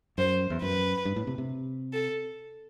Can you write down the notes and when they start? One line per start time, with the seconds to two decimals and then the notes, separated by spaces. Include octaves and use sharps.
0.18 F#2 C5
0.50 E2
0.62 F#2 B4
1.05 G2
1.16 A2
1.27 C3
1.38 C3
1.93 A4